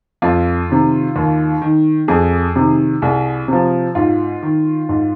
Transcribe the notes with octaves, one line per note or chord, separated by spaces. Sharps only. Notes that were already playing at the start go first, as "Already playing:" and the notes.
F2 F4
C3 D#3
D#2
D#3
F2 G#4
C3 D#3
C2 G#4
C3 F3
G#2 F4
D#3
G#2